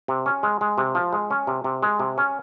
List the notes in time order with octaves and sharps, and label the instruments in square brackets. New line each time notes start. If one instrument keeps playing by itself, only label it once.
[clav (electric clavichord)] C3
C#4
G#3
G#3
C3
F3
G#3
C#4
C3
C3
G#3
C3
C#4